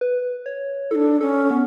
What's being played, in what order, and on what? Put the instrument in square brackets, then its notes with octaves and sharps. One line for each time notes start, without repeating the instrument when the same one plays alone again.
[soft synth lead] B4
C#5
[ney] D4 E4 [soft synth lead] A4
[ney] C#4 [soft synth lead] A4
[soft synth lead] B3 [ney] C#4